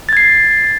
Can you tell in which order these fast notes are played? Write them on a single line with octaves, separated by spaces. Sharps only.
A6 G#6 C7